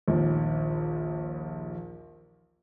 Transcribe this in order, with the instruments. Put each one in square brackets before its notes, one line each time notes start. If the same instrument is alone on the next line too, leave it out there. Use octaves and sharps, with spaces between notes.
[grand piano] A#1 D#2